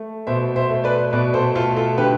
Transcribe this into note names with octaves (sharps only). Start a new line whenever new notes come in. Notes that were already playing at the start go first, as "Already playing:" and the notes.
Already playing: A3
B2 C5 E5
C5 E5
A3
B4 D5
B2 B4 D5
A4 C5
A3 F4 A4
F4 A4
D3 G4 B4